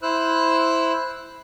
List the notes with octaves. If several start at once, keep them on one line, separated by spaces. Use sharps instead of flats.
E4 C5 E6 F#6